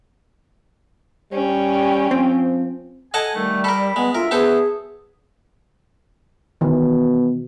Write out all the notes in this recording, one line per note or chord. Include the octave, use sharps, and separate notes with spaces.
G3 C#4 G5
F3 C4
A4 D#5 F#5 G#5 A5
D#3 G3 A3
A4 A#4 B5
G#3 B3
D2 F4 A#4 E5
B3 G#4 A4 C5
B2 D#3 E3